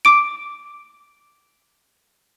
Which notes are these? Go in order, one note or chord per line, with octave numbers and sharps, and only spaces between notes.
D6 D7